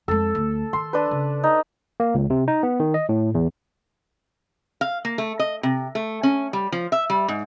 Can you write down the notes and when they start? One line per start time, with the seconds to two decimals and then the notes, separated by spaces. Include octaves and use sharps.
0.08 F2 G#3 A4
0.35 D2
0.73 D#3 C6
0.93 D4 B4
1.11 C#3
1.44 D#4
2.00 A#3
2.14 C#2
2.30 C3
2.48 D#4
2.63 B3
2.80 D#3
2.94 D#5
3.09 A2
3.35 E2
4.81 F5
5.05 A#3
5.18 A3
5.39 D#5
5.63 C3
5.95 A3
6.23 C#4
6.53 G3
6.72 F3
6.92 E5
7.10 G3
7.28 G#2